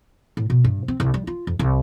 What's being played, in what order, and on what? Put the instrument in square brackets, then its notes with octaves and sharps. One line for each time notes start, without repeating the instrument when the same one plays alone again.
[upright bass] A2
B2
G2
C4
C2
G3
F4
F2
C2